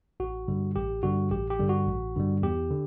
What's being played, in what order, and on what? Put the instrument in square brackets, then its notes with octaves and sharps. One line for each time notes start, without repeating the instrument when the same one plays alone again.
[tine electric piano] A1 F#4
G2 D3 G3
A1 G4
G2 D3 G3 F#4
A1 G4
G4
G2 D3 G3
F#4
A1
G2 D3 G3
E2 G4
D3